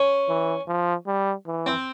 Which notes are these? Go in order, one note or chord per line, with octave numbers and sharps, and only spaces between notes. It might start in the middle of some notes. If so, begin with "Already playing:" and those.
Already playing: C#4
E3
F3
G3
E3
C4